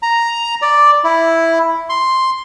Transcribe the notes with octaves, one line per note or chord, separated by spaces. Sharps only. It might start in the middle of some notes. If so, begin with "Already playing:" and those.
A#5
D5
E4
C6